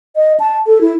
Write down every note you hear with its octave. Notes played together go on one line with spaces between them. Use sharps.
D#5
A5
A4
E4